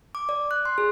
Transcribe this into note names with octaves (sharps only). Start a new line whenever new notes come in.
D6
D5
F#6
C6
G#4